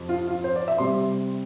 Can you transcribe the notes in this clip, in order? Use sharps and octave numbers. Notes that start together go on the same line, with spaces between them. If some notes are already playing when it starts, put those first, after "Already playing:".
Already playing: F2 C3 F3
F4
F4
C5
D5
E5
C3 G3 C6